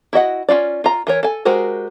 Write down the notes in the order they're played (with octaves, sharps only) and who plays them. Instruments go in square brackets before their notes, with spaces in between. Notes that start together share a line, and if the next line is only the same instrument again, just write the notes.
[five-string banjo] E4 F#4 D#5 F#5
C#4 E4 F4 D5
F4 A#5
E3 A#4 C#5
A4 G#5
G#3 F#4 G4 A#4 C5